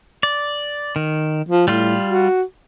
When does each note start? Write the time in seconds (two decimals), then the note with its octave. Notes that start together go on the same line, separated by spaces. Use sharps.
0.23 D5
0.96 D#3
1.49 F3
1.68 A2 G3 F4
2.05 F#4